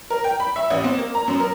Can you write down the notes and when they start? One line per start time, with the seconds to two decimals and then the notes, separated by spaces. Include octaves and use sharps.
0.10 A#4
0.24 G5
0.40 B5
0.56 E5
0.70 A1
0.84 C4
0.98 A#3
1.15 A#5
1.28 F#2
1.40 A#4